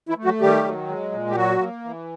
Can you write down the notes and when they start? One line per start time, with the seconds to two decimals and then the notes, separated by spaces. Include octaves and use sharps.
0.09 E3 E4
0.17 A3
0.25 F#3 F#4
0.41 D#3 G3 G4
0.64 F#3
0.88 G#3
1.12 A#2
1.30 G4
1.36 F#3 F#4
1.59 A#3
1.85 E3